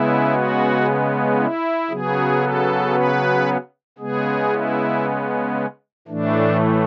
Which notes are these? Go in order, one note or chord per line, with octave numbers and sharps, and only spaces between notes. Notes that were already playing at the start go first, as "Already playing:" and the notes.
Already playing: C#3 G#3 B3 E4
F#4
E4
C#3 F#3 B3 G#4
A4
B4
C#3 G#3 B3 G#4
E4
A2 E3 A3 D4